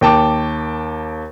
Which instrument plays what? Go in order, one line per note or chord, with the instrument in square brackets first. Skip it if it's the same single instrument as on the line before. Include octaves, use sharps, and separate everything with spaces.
[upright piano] D#2 G5 A5 D6